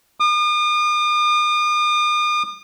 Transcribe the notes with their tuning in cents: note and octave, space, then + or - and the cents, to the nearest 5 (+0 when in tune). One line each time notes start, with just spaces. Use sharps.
D#6 -45